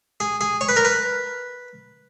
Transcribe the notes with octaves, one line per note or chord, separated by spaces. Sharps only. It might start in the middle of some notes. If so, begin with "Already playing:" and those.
G#4
G#4
C#5
B4
A#4
B4